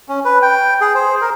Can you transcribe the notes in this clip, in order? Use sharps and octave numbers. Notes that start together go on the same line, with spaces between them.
C#4
B4
G5
G#4
C5
A#4